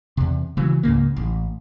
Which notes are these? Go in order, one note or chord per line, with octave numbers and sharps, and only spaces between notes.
E2 C3
C#3 E3 F#3
C#2 G#2 C#3 A#3
A1